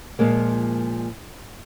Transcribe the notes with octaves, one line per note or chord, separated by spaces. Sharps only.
A#2 F3 G#3 A#3